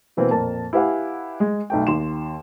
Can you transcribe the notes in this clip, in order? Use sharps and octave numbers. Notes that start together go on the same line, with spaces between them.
B2 E3 A#3 C4
F2 A#2 A#4 A5
E4 G4 B4 F5 F#5 G#5
G#3
B1 A3 G5
D#2 C6 E7